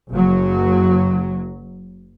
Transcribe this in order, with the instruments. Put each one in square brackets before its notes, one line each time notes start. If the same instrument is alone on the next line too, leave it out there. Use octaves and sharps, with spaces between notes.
[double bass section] F#1 F#3